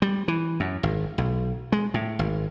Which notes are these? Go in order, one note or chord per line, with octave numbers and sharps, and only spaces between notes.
G3
E3
F#2
G#1
B1
G#3
A2
G#1